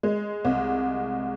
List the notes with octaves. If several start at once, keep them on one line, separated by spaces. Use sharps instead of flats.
G#3
C2